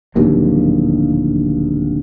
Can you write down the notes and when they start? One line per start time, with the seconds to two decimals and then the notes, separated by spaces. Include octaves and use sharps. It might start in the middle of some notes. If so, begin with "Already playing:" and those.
0.15 D1 A#1 D#2 F#3